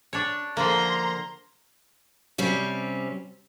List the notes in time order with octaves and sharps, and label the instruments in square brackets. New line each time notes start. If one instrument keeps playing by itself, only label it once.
[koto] D4 C#5
[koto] D3 F3 A#3 [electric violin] A#5 C6
[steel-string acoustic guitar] C3 G3 C4 C#4